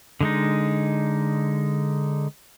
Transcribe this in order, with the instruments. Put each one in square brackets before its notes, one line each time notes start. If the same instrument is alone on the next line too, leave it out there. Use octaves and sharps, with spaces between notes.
[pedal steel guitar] D3 G#3 D#4